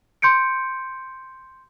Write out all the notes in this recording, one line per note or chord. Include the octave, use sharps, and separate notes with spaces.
C6 G6 C#7 D7